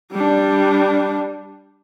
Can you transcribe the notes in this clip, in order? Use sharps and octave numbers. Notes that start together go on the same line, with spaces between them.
G3 D4